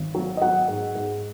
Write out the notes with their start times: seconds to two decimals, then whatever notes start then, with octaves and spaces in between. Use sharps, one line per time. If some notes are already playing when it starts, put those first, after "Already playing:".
Already playing: G#1
0.15 F#3
0.37 D#5
0.42 F#3 F#5
0.68 G#2
0.95 G#2